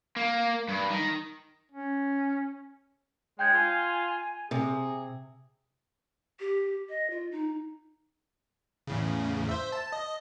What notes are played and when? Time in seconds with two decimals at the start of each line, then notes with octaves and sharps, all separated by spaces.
0.16 A#3
0.68 G2
0.90 D#3
1.72 C#4
3.39 G#3 D4 G#4 C#5 G5 G6 G#6
3.53 F4 G#5
4.51 C3 G#4
6.40 G4
6.89 D#5
7.11 F4
7.32 D#4
8.87 E2 A2 C#3
9.49 C5 E5
9.72 A5
9.92 D#5